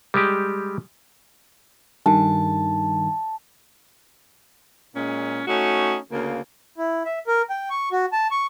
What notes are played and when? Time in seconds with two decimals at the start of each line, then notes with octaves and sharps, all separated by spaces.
0.14 G3 G#3 G4
2.06 G2 D#3 A5
4.95 A#2 G#3 C#4
5.47 A3 C#4 D#4 F#4
6.11 D2 C#3 A#3
6.78 E4
7.05 E5
7.27 A#4
7.50 G5
7.70 C#6
7.92 F#4
8.12 A5
8.31 C#6